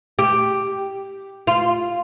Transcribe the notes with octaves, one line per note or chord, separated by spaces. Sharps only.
G4
F4